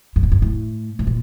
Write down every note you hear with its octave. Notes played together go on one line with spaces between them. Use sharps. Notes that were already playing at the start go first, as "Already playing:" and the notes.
G2
A2
G2
A2
A2
A#2